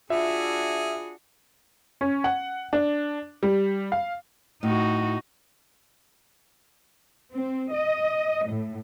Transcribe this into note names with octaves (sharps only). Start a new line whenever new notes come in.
D4 F4 F#4 G#4 E5
C#4
F#5
D4
G3
F5
A2 D#4 F#4
C4
D#5
A2